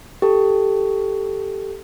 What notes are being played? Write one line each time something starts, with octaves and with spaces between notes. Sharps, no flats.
G4 A4